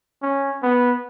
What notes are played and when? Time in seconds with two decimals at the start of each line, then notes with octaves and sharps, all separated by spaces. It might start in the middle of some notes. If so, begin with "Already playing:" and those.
0.22 C#4
0.63 B3